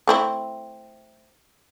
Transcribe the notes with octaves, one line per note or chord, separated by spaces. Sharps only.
A3 C4 E4